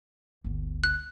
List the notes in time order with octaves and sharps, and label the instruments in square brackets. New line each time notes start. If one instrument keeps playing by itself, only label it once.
[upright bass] G1 D2
[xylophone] F#6